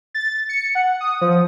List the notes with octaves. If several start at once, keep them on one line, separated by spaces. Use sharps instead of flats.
A6
C#7
F#5
D#6
F3